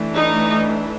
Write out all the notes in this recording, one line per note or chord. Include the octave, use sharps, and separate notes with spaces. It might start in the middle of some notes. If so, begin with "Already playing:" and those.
Already playing: E3 A3 D4
D#4